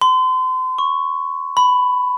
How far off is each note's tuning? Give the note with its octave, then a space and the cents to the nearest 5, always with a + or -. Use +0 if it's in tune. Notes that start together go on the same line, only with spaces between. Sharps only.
C6 -35
C#6 -5
B5 +15